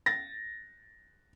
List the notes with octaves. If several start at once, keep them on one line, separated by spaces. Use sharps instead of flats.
A6 A#6